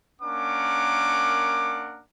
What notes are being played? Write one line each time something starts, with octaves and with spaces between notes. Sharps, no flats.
A#3 C#4 D4 A#4 F#5 D6